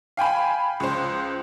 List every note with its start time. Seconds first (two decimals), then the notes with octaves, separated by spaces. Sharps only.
0.17 F5 G5 G#5 B5
0.80 C#2 C5